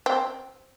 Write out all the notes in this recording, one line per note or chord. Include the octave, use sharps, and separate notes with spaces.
C4